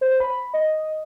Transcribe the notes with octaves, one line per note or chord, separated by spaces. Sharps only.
C5
B5
D#5